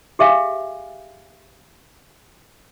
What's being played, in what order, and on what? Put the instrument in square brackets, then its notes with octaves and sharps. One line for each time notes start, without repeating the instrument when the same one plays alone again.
[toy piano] G4 G#4 E5 F5 G#5